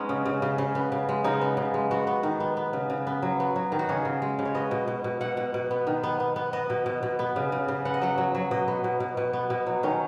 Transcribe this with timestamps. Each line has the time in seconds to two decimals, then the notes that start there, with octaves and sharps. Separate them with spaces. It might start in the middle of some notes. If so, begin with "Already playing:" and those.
Already playing: G#3 B3 C#4 D#4
0.09 C#3
0.26 C#3
0.42 C#3
0.58 C#3
0.75 B3
0.92 C#3
1.09 G#3
1.24 C#3 D#4
1.41 B3
1.57 C#3
1.74 G#3
1.91 B3 F#4
2.07 B3
2.23 D#3
2.40 B3
2.57 B3
2.73 C#3
2.90 C#3
3.07 B3
3.22 F#3
3.40 B3
3.56 F#3
3.72 D#3
3.79 F#4
3.89 C#3 G#4
4.05 C#3
4.22 G#3
4.39 C#3
4.45 C#5
4.55 B3 D#5
4.71 B2
4.88 B2
5.04 B2
5.21 B2 F#5
5.37 B2
5.54 B2
5.71 B3
5.87 D#3
6.03 B3
6.20 B3
6.36 B3
6.53 B3 D#5
6.70 B2
6.86 B2
7.03 B2
7.19 B3
7.36 C#3
7.52 C#3
7.68 C#3
7.85 B3 F#5
7.94 D#5
8.02 F#3 F#5
8.18 F#3
8.35 F#3
8.51 B2 D#5
8.68 B3
8.84 B2
9.00 B2
9.17 B2
9.33 B3
9.50 B2
9.67 F#3
9.83 D#3 C#4